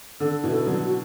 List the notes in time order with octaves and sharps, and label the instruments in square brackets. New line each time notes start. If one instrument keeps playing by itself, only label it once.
[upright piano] D3 [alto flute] A4
[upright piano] B2 E3
[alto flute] A4
[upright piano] D3 F#3
[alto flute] F#4